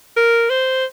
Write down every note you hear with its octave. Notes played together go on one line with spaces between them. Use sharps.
A#4
C5